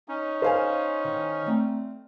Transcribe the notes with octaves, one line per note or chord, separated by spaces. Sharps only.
C#4 D#4
C5 F5 G#5
D#3
A3 C4 D5